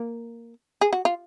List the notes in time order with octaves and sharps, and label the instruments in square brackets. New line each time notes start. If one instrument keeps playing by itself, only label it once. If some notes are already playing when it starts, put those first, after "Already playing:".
Already playing: [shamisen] A#3
G#4
F#4
F4